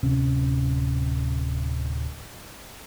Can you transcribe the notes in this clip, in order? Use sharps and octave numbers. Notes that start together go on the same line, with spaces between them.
D1 C3 C#4